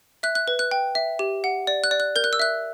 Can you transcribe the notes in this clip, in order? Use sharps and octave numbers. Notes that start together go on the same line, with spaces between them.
E5 F#6
F#6
B4
F#6
G5
E5
G4
F#5
D5
F#6
D5
F#6
A#4 G6
F#6
E6
E5 F#6